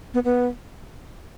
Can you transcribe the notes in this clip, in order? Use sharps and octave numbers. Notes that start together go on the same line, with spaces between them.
B3
B3